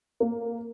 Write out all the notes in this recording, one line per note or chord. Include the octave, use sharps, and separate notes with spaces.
A#3